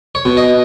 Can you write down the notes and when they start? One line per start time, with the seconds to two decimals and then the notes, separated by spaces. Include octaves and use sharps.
0.15 C#5
0.25 B2
0.37 D#5